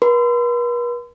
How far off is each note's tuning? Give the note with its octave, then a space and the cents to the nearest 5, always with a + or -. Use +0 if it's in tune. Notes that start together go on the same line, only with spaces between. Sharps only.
B4 -45 C6 -40